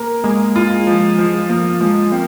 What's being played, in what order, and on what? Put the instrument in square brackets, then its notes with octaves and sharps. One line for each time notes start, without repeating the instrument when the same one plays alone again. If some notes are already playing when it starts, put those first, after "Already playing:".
Already playing: [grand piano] A#3 A#4
[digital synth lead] G#3 [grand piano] A#3
[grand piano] F4
F3
F3
[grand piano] F3 [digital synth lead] A#3
[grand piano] F3 [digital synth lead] G#3
[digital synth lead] A#3 [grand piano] C4